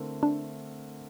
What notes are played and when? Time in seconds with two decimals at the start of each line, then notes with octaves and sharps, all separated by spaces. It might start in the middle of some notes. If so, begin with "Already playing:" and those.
Already playing: D3 A3 C4 E4 A#4
0.23 D4